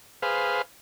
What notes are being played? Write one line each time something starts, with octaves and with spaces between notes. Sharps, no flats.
G#4 B4 C5 F5